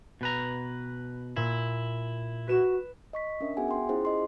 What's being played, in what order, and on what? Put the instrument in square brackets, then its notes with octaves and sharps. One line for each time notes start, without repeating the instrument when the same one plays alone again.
[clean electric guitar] B2 B4 A#5
[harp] A#2 [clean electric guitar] E4
[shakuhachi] F#4 [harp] B4 E7
[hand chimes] D#5 C#6 B6
C#4 D4 A#4 E5
B3 F#4 G#4 E5 F#5 G#5
G5 C6
C#4 E4 F4 G#4 C5
D#5 C6